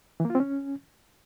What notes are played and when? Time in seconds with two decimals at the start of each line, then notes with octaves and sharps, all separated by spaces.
0.20 E3
0.25 A#3
0.30 F4
0.35 C4
0.40 C#4